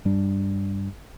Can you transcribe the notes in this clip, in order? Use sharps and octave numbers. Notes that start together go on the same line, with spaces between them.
G2 G3 D4